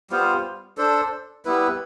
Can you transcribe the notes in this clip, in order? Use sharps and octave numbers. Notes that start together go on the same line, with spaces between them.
G3 B3 F4 C5
D4 A4 C5
G3 B3 E4 B4